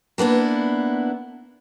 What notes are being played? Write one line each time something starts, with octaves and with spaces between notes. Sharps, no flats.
A#3 B3 D4 E4